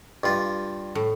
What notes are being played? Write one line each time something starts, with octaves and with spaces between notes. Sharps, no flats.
G2 F4
A2